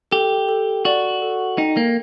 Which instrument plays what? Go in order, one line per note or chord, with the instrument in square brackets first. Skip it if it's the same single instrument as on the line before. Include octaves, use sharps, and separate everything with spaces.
[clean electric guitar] G4 [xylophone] A4
[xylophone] A4
[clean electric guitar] F#4 [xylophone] D5
[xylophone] A4
[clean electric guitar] D#4 [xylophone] G5
[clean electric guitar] A#3